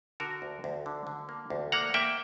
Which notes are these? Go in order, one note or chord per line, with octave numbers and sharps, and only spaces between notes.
D3 F#4 A#4
D2
D2
D3
D3
A#3
D2
A#3 F#5 A#5
A#3 E5 G5